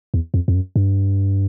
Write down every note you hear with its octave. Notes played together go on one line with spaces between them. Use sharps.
E2
F2
F2
F#2
G2